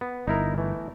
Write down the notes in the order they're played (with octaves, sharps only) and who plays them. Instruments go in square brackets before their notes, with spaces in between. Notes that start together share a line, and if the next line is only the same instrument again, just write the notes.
[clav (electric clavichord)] B3
[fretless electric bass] G1 [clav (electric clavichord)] D#4 E4 A#4
[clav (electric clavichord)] E3 A3